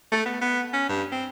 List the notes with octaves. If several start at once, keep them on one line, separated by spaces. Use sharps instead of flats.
A3
B3
B3
C#4
G2
C4